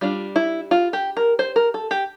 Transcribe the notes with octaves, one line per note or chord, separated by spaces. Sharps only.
G3 D4 F4
E4
F4
G4
A#4
C5
A#4
A4
G4